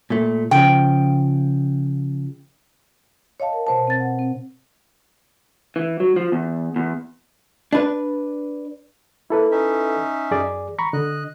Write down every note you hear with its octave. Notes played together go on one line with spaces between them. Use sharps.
A#2 A3
C#3 F3 G5
C#5 D#5 F5 A5
A#4
B2 C5 A5
C4 A6
F#5
C4
E3
F#3
F3
E2
E2
D4 B4
A#3 E4 A4 B4
C#4 D#4 E5
F#2 G#4 D5
A#5 B5 C#6
D3 D#5 F#6